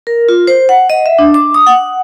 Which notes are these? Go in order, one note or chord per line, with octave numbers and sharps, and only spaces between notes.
A#4
F4
C5
F#5
D#5
E5
D4
D6
D#6
F#5